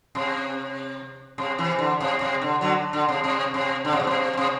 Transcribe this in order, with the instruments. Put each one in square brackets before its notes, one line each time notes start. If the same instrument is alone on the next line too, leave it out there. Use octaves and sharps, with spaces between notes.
[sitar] C3
C3
C3 E3
D3
C3
C3
D3
D3 F#3
D3
C3
C3
C3
D3
C3
B2
C3
C3